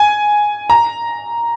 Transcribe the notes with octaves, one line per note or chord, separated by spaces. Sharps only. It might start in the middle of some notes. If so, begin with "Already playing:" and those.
Already playing: G#5
A#5